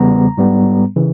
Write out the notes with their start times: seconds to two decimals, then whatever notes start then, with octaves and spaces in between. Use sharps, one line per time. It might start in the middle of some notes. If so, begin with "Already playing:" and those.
Already playing: E2 C#3 G3 B3 A#5
0.37 G#2 G3 B3
0.96 C#3 E3